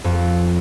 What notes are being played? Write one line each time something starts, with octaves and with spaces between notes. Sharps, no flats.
F2